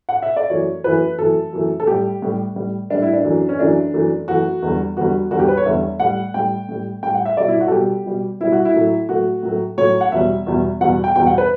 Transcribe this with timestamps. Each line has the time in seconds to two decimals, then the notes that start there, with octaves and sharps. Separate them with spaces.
0.09 F#5
0.23 E5
0.36 D5
0.50 F#2 E3 A3 C#5
0.84 F#2 E3 A3 B4
1.19 F#2 E3 A3 A4
1.53 F#2 E3 A3
1.80 A4
1.87 A2 G3 G4
2.22 A2 G3
2.56 A2 G3
2.90 G3 D4
2.94 A2
3.02 E4
3.13 D4
3.25 F#2 E3 A3
3.49 C#4
3.59 F#2 E3 A3 D4
3.94 F#2 E3 A3
4.28 F#2 E3 A3 F#4
4.62 E2 D3 G3
4.97 E2 D3 G3 F#4
5.31 E2 D3 G3 F#4
5.39 G4
5.48 B4
5.57 C#5
5.66 E2 D3 G3 E5
6.00 A2 G3 F#5
6.34 A2 G3 G5
6.69 A2 G3
7.03 A2 G3 G5
7.15 F#5
7.26 E5
7.37 B2 G3 D5
7.48 E4
7.60 F#4
7.68 A4
7.71 B2 G3 G4
8.06 B2 G3
8.40 B2 G3 E4
8.52 F#4
8.65 E4
8.74 A2 F#3 A3
9.09 A2 F#3 A3 F#4
9.43 A2 F#3 A3
9.78 A2 F#3 A3 C#5
10.01 F#5
10.12 E2 B2 G3 E5
10.47 E2 B2 G3
10.81 E2 B2 G3 F#5
11.04 G5
11.16 E2 B2 G3 G5
11.27 F#5
11.38 B4